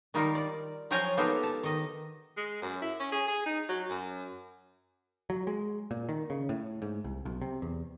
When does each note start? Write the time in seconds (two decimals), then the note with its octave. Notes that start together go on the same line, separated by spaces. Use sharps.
0.14 D#3 G3 D#4 F4 A#4
0.35 D5
0.91 F3 F#3 F4 G5 G#5 A#5
1.17 A#3 B3 D#4 F4 G4 A4
1.43 A5
1.63 D#3 D#5
2.37 G#3
2.62 F#2
2.82 E4
3.00 C#4
3.12 G#4
3.28 G#4
3.46 D#4
3.69 F#3
3.90 F#2
5.30 F#3
5.47 G#3
5.91 A#2
6.09 D#3
6.30 C#3
6.49 A2
6.82 G#2
7.04 C2
7.25 B1
7.42 C3
7.62 E2